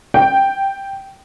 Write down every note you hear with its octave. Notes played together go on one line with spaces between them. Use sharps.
G5